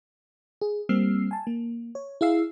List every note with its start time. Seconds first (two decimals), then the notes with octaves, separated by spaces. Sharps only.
0.61 G#4
0.89 G3 A#3 C4 E6 F6 C7
1.31 G#5 A5
1.47 A#3
1.95 C#5
2.21 E4 G#4 F5 E6 C7